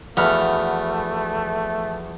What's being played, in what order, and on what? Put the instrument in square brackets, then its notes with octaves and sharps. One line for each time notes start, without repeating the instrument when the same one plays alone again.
[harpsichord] E2 [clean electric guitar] F3 F#4 F5 [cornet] A3 [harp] F#5 B5 F6